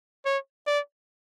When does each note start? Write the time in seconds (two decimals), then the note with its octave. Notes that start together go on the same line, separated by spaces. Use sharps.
0.25 C#5
0.67 D5